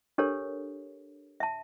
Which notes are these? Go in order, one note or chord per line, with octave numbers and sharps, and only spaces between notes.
D4 G4 A4 A#4 C#5
E5 A5